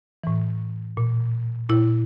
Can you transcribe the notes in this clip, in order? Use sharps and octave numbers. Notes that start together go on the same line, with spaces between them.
A2 E3
A#2
A#2 E4